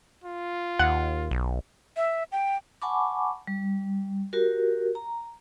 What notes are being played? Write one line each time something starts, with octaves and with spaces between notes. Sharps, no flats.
F4
D#2 F#5
B1
E5
G5
F#5 G#5 A5 B5 C#6 D6
G3
F#4 G4 A#4
A#5